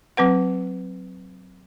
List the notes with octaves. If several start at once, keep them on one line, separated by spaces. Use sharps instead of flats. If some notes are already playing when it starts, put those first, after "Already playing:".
F#3 C4 B4 F#5